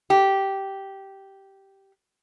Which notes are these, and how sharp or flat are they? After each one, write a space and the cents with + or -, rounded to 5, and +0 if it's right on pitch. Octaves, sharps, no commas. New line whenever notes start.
G4 -10